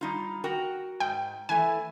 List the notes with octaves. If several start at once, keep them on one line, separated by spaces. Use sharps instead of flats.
G3 D#4 F4
F#4 A#4 G5
G#2 G5
E3 A3 G#5